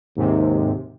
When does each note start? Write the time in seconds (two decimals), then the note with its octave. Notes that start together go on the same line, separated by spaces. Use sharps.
0.17 D#2 G#2 C3